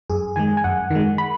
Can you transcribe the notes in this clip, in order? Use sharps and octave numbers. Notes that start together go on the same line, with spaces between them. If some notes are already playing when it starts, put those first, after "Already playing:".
F#2 G#4
D#3 G#3 G#5
G#5
F#2 F#5
D#3 G#3
B5